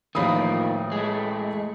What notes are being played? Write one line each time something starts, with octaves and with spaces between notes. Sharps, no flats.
A1 D#3 F3 A#3 B5 D#6
G#3 A3